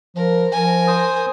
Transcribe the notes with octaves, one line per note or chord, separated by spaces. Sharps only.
F3 A#4
F3 A#4 G#5
C5 D#6